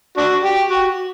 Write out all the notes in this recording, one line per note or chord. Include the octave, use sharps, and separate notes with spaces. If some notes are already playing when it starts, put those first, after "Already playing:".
D4 F#4
G4
F#4